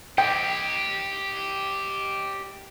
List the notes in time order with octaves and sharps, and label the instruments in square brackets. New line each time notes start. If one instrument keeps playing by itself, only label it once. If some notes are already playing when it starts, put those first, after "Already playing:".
[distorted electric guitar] G4 D#5 [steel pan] G5